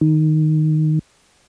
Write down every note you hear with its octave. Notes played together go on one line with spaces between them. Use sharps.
D#3